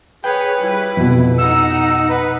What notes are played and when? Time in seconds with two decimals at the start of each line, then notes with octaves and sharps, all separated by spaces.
0.24 G#4 B4 C#5 G5
0.60 G3 E4
0.97 F2 B2
1.38 D#4 F#5 E6
2.09 B4